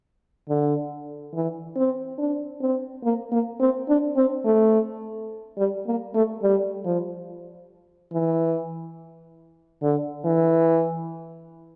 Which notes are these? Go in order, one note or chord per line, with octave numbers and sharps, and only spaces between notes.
D3
E3
C4
D4
C4
A#3
A#3
C4
D4
C4
A3
G3
A#3
A3
G3
F3
E3
D3
E3